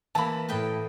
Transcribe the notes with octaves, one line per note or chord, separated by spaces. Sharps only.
E3 A#3 A5 B5
A2 A3 A4 B4 G5 D#6